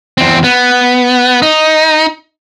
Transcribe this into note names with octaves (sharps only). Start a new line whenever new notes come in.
E2 C4
B3
D#4